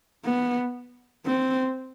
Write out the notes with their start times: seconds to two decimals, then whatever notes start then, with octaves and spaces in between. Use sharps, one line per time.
0.25 B3
1.26 C4